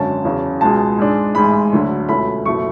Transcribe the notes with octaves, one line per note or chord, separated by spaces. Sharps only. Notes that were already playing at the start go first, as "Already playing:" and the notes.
Already playing: G#1 F#2 D3 F#3 C#4 A5
E2 C#3 F#3
C#2 B2 G#3 A5
G#2 G#3 D4
A1 G#2 G#3 B5
D2 D3 F#3
C#2 B2 A3 C#4 E4 B5
F#1 B2 A3 E4 C#6